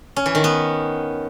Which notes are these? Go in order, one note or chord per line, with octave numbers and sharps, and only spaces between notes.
C#4
E3
D#3
B3